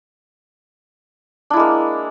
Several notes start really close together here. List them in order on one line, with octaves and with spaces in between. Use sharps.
D4 E4 G#3 A#3